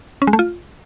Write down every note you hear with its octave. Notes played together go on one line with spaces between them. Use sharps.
C#4
G#3
A3
F4